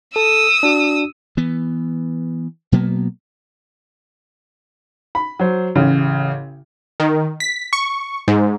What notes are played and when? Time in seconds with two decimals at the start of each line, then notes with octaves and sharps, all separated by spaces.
0.16 A4 D#6 E6
0.63 D4 F#4
1.37 E3 B3
2.72 B2 F#3 A#3 B3
5.15 B5
5.39 F#3 C5
5.75 A1 C#3
7.00 D#3
7.40 B6
7.73 C#6
8.28 G#2